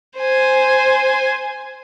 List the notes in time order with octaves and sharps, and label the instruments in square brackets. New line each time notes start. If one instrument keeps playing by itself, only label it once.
[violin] C5 G#5